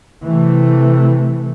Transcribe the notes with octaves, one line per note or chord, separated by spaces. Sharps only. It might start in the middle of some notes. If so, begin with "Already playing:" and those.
C3 E3 A3